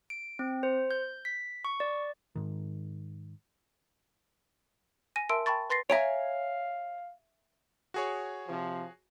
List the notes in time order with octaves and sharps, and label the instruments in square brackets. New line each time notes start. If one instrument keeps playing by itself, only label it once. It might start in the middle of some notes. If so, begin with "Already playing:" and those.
[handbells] D7
C4
C5
G6
B6
C#6
D5
[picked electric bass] G#2 D#3
[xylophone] G#5 A#6 D#7
A#4 E5 A5 C6 E6 D7
G5 A5 B5 C#6 A6
B4 C6 A6 A#6 C7
[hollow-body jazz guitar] C#5 G#5 A#5 [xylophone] E5 D7 [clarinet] F5
[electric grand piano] F#4 G#4 C#5
[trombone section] C3 F3